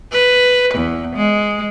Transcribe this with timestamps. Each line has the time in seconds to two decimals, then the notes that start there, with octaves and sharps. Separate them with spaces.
0.12 B4
0.74 E2
1.16 G#3